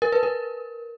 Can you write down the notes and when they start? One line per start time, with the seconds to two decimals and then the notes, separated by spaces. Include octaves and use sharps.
0.02 A#4
0.12 B4
0.23 A#4